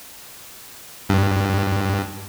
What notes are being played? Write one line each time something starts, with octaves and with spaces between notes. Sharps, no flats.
G2